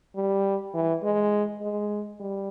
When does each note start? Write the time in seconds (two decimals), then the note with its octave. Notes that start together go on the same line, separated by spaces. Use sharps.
0.16 G3
0.74 E3
1.03 G#3
1.62 G#3
2.20 G3